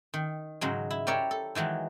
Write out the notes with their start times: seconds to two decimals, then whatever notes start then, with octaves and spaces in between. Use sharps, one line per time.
0.14 D#3
0.61 G#2 C#3 F#3 G#3
0.91 E4
1.07 G4 A#4 C#5 D5 E5
1.31 A4
1.55 D#3 E3 F#3 G#3